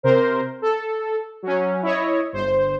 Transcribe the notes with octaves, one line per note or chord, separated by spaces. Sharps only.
C3 A#4 C5
A4
F#3 C#4
E4 C#5 D#5
G1 C5